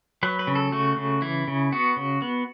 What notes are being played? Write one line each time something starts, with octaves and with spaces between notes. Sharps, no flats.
F#3 B4
B4
C#3
A4
A3 F#4
C#3
E3 E4
C#3
B3 F#4
C#3
B3